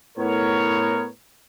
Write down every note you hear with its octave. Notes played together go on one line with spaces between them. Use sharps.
A2 B3 A#4 C#5